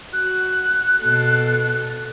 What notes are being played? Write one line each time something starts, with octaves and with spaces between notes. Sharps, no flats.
F#4 F#6
B2 A4